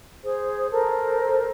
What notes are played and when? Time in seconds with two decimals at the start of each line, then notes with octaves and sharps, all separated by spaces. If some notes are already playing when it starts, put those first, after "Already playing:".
0.23 G#4 C5
0.70 A4 A#4 C5